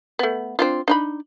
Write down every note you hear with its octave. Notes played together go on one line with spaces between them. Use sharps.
A3 B3
C4 D4 F4
D4 D#4 B5